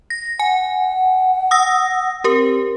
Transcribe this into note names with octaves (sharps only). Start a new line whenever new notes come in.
A#6
F#5 G#5
D#6 E6 A#6
C4 G4 A#4